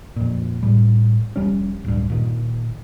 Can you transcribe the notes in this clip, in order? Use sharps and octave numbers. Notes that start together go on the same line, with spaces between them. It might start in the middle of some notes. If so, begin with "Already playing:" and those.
F2 A#2
A2 G3
F1 G#2 G3 C#4
D1 G2
A#2 D#3